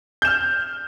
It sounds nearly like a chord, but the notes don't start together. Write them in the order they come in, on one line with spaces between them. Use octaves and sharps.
G6 E7 F6